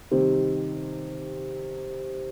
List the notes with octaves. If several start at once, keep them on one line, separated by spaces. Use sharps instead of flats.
C3 D#3 G3 C4